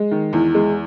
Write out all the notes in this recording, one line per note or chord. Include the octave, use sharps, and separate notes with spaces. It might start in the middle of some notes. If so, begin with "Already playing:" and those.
Already playing: G#3
D#3
E2
G#3